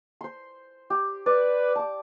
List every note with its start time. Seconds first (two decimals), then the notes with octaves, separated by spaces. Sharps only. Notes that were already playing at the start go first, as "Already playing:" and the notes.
0.21 C5 C6
0.90 G4
1.26 B4 D5
1.76 A5 D6